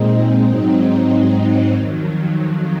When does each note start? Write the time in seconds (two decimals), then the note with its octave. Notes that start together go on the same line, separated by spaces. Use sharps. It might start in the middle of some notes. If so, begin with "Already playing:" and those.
Already playing: A#2 G#3 C4 D#4
0.46 G#2 F#3 C4 D#4
1.74 F2 D#3 F#3